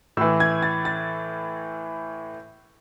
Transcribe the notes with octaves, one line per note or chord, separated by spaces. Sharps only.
A2 E3 E6
G#6
A6
A6